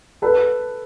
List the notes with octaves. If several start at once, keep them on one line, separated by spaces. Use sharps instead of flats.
A4 B4